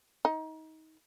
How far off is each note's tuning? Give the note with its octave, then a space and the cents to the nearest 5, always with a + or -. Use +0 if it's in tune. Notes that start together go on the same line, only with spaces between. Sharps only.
D#4 +25